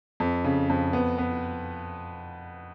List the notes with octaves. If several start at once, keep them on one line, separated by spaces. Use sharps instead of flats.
F2
C#3
F2
B3
B3